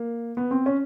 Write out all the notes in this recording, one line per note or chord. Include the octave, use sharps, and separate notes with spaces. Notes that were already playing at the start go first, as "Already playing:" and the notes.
Already playing: A#3
B3
C4
C#4